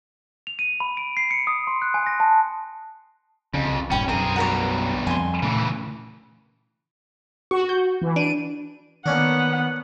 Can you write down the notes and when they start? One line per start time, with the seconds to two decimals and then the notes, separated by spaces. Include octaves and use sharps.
0.47 F7
0.59 D#7
0.80 B5
0.97 D7
1.17 C7
1.31 C#7
1.47 D#6
1.67 C6
1.82 F#6
1.94 G#5
2.06 A#6
2.20 A5
3.54 C2 F2 C#3
3.91 D#1 G2 C#4 G5 B5
4.09 B1 F#2 C4 G#4 A#4
4.36 G2 B2 F#4 A#4 C#5
5.07 F2 G#5 C6
5.43 A#2 C#3 E3 A3
7.51 F#4 C#6
7.69 G6
8.01 E3
8.16 D4 D7 D#7
9.06 D#3 A#3 B3 C#4 D4 F#5